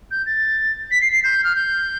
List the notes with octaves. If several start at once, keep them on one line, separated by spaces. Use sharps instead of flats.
G6
A6
B6
C7
C7
G6
F6
G6